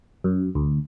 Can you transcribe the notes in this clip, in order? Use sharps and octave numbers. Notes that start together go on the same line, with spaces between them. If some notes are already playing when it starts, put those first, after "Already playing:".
F#2
D2